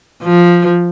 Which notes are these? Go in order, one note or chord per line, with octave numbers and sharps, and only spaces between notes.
F3